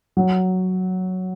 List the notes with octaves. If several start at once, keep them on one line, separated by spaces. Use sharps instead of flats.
F#3